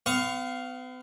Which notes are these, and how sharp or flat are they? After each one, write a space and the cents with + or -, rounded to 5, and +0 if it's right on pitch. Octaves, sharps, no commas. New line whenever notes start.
B3 +45 F5 +0 C#6 +0